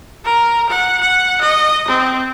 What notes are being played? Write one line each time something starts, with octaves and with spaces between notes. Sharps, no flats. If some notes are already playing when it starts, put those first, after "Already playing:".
A#4
F#5
F#5
D#5
C4